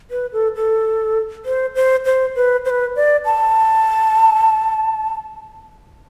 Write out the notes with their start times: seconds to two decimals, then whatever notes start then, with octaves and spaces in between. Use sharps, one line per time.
0.11 B4
0.33 A4
0.56 A4
1.45 C5
1.75 C5
2.05 C5
2.36 B4
2.65 C5
2.70 B4
2.96 D5
3.25 A5